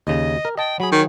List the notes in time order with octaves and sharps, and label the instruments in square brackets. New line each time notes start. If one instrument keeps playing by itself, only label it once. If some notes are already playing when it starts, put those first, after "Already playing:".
[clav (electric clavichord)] D#2 C#3 [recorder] D#5
[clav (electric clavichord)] A#4
[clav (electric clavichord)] D#5 A5 [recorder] G5
[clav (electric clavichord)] F#3 G#4 [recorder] B5
[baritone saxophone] D#3 [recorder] C#5